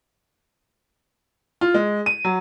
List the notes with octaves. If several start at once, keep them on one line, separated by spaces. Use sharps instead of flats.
F4
G#3
D#7
F#3